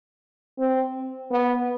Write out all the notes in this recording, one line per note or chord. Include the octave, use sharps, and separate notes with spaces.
C4
B3